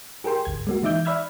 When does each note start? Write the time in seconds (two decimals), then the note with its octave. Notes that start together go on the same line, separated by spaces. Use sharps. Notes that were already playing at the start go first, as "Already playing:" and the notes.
0.24 G4 G#4 A#4 G5 C6
0.45 G#1 D2 G#6
0.67 G#3 A#3 F#4
0.83 E3 D#4 E5 D6 G6
1.05 D5 E5 B5 E6 F6 G#6